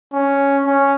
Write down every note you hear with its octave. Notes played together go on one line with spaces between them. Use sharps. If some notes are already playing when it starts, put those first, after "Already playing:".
C#4
C#4